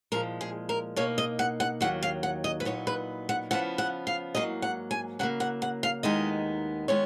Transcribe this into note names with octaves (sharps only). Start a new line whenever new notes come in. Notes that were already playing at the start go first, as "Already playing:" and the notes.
A#2 F3 G#3 A#4
G#4
A#4
B2 A#3 D#4 C#5
D#5
F#5
F#5
D#2 D#3 F#3 F#5
F5
F#5
D#5
B4
A#2 F#3 B3 D#4 C#5
B4
F#5
C#3 F3 B3 F#5
F#5
F5
G#2 F#3 A#3 D#5
F#5
G#5
C#3 F#3 A#3 F#5
F#5
F#5
F5
D#2 D#3 G#3 B3 D#4 D#5
D#3 G#3 B3 C#5